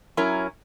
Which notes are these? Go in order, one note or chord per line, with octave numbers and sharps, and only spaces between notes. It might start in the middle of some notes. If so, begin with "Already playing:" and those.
F#3 C#4 E4 A#4